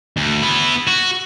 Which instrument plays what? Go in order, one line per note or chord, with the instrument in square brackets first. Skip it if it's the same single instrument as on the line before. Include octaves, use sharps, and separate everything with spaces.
[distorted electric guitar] D2
B3 E4
F#4